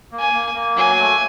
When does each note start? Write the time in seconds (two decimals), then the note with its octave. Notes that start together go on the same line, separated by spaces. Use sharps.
0.12 A#3
0.19 G#5
0.34 A#3
0.55 A#3
0.76 F#3 G#5
0.98 A3